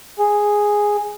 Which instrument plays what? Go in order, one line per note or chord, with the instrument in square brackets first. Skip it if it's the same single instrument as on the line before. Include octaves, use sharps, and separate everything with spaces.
[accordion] G#4